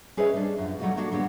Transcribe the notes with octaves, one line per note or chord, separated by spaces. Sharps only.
C#4 G#4 B4 C#5 D#5 E5
G3 D4
F#2 F4
F#3 G3 A3 D#4 F4 F#4
F#3 A#3 D4 F#4 A4
D3 F#3 G3 A#3 B3